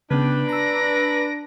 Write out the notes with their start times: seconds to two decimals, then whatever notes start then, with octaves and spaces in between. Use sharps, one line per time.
0.11 C#3 B3 D4 B4 G5
0.49 A#5 E6 A#6 D7